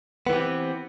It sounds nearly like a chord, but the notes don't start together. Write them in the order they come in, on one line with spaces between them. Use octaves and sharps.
B3 E3 G4 C4